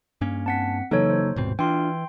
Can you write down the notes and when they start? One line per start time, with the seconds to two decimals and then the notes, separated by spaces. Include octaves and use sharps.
0.21 G2 A#3 C#4
0.46 C4 F#5 A5 B6
0.91 C#3 E3 F#3 A#3 D#4 A4 C#5
1.10 C5
1.36 D#1 G#2 B2 C4
1.59 E3 D4 F4 G5 C6